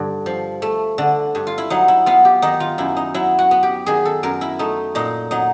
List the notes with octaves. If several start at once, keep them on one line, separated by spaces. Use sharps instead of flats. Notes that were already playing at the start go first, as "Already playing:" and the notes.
Already playing: G2 D3
F3
A3
D3
G2
F4
E4
F#3 D#4
E4
B3 F4
G4
D#3 D#4
F4
F#2 E4
D#4
F#3 E4
F#4
B3
G4
D#3 G#4
A4
F#2 A#4
E4
A3 D#4
A#2 D#4
F#3 D#4